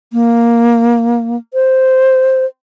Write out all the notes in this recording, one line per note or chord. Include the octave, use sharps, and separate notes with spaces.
A#3
C5